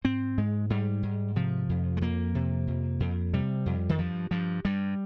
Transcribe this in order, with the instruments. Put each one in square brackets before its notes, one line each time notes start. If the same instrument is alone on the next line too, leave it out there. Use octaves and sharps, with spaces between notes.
[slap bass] G#2 C4
G#2 G#3
G#2 G3
G#2
C3 F3
F2
G#3
F2 A#3
C3
F2
F2
C3 G3
F2
D#3
G2 F3
G2 F3
G2 G3